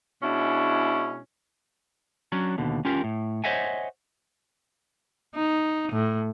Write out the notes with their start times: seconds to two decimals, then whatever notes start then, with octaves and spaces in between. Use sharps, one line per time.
0.23 B2 G#3 C#4 D4 E4
2.32 F#3 C#4 D4
2.58 D#2 B2 D3
2.85 C#4 F4 G4 A#4
3.04 A2
3.44 C5 C#5 D#5 E5 F#5 G#5
5.35 D#4
5.93 A2